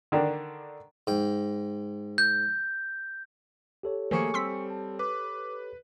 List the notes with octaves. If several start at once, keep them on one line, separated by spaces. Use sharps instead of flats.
D3 D#3 D4
G#2 G5
G6
G4 A4 C#5
D#3 F3 A3 A#3 G#4 G#5 C#6 C#7
G3 C4 C6 E6 B6
A5
B4 D6